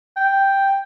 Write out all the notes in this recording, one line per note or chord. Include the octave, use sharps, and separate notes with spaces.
G5